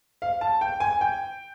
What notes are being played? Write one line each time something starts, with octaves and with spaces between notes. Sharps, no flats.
F5
A5
G5
G#5
G5